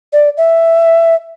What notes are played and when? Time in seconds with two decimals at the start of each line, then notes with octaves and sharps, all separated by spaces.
0.12 D5
0.37 E5